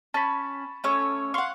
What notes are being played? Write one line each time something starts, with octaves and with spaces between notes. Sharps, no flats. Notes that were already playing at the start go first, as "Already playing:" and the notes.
C#4 A5 B5
A3 C#4 C#5
F5 F#5 C6 C#6